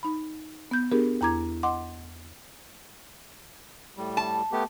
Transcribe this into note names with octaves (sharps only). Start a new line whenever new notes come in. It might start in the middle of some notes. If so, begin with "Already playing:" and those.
D#4 B5
B3 G6
B3 D4 G4 G#4 A#4
E2 E4 A#5 D6 G#6
D#5 F#5 C6 D6
A2 G3
A5
A3 B3 G4